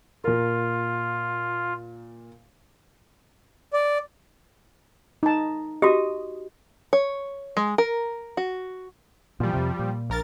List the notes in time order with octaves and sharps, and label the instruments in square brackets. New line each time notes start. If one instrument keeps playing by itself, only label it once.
[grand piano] A#2 A#4 [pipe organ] F4
[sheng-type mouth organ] D5
[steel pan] D#4 A5
[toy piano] F#4 G4 [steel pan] D#5
[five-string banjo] C#5
G#3
A#4
F#4
[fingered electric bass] A#2 E3 [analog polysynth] F3 G3
[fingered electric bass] F2 C3
A#2
[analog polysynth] A#1 A#4 A6